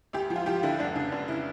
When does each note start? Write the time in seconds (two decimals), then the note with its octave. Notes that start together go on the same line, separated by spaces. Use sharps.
0.13 D2 G4
0.30 F3
0.36 F4
0.46 F3 G4
0.63 D3 E4
0.79 F1 D4
0.95 C#3 D4
1.12 F1 D4
1.28 C#3 E4